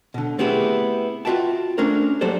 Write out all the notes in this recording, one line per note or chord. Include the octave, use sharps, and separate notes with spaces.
B2 D3
A3 B3 C4 E4 G4 G#4
F4 F#4 G#4 E5 G5 A5
A3 C#4 D4 A#4 C5
F#3 A#3 G4 A4 C5 D5